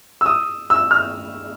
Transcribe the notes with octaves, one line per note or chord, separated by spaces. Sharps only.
E6
D#6
E6
F6